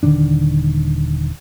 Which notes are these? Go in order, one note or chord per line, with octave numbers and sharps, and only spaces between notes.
D#1 D3 D#3 D4